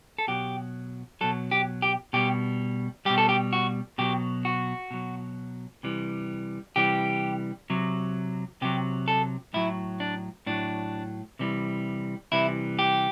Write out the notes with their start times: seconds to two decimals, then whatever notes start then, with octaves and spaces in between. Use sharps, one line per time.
0.18 A4
0.28 B2 F#3 G4
1.21 B2 F#3 A4
1.51 G4
1.82 G4
2.13 B2 G3 G4
3.05 B2 G3 G4
3.18 A4
3.29 G4
3.53 F#4
3.98 B2 F#3 G4
4.45 F#4
4.91 B2 F#3
5.83 C3 E3 G3
6.76 C3 E3 G3 G4
7.70 C3 F#3
8.62 C3 F#3 G4
9.08 A4
9.54 A2 F#3 E4
10.00 D4
10.46 A2 F#3 D4
11.39 C3 E3 G3
12.32 C3 E3 G3 E4
12.79 G4